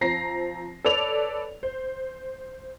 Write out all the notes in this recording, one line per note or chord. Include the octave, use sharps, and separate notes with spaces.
F3 C4 A#5 A#6 C7
A4 B4 C#5 D5 F7
C5